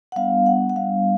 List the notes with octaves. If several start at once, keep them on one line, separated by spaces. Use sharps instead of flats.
F#5
G3 B3 D4 F5
F#5
F#5
G3 B3 D4 F5